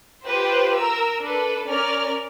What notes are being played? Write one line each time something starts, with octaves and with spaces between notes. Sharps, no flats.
F4 G4 B4 C5
A#4 A#5 E6
D4 A4 B4
C#4 A#4 D5 F6